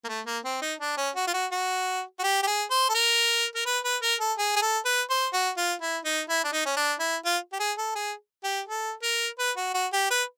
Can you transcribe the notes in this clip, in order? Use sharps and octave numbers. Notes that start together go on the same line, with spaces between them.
A#3
A3
A#3
C4
D#4
D4
C#4
F#4
F4
F#4
F#4
F#4
G4
G4
G#4
C5
A4
A#4
A#4
B4
B4
A#4
A4
G#4
G#4
A4
B4
C5
F#4
F4
E4
D#4
E4
D4
D#4
C#4
D4
E4
F4
G4
G#4
A4
G#4
G4
A4
A#4
B4
F#4
F#4
G4
B4